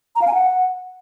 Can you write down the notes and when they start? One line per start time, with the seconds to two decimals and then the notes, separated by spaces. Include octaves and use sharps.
0.16 A#5
0.22 F5
0.27 G#5
0.33 F#5